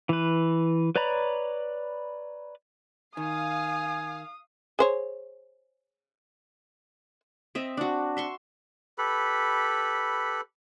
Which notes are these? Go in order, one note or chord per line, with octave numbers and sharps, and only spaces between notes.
E3 B4
B4 C#5 D5 A#5 B5
D#3 F5 G#5 D#6
G#4 C5 C#5
C4 D#5 E5
D4 F#4
E5 C6 C#6
G4 A4 B4 B5